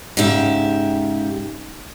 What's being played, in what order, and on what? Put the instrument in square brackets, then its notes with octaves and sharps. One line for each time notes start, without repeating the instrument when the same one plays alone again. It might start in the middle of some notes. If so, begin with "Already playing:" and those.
[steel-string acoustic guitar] G#2 C#3 G4 E5